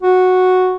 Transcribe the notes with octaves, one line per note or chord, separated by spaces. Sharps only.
F#4